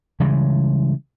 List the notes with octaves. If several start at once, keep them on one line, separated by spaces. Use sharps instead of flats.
C#3 E3 G3 G#3